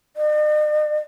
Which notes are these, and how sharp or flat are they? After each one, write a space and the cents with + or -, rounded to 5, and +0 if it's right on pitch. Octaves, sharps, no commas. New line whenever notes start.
D#5 -45